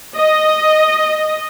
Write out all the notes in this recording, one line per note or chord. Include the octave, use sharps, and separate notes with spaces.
D#5